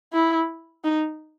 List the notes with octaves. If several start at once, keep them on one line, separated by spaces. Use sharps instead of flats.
E4
D#4